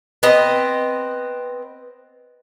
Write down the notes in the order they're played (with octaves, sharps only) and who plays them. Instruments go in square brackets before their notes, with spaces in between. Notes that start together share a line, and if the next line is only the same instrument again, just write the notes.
[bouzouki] B3 C4 D#5